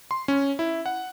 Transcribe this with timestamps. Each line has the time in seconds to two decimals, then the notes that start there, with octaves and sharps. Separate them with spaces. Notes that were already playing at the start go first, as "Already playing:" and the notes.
0.11 C6
0.28 C#4
0.59 E4
0.86 F#5